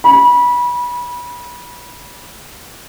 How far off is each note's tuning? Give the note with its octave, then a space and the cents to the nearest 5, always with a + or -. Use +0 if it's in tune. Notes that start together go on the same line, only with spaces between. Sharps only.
B5 -25